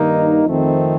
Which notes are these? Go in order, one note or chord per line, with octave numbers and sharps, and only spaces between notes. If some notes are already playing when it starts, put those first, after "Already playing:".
Already playing: G2 D#3 A#3 D#4
F2 D#3 A3 C4 D#4